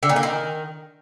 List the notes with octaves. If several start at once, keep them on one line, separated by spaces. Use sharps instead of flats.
D3
A#2
A#3
D#3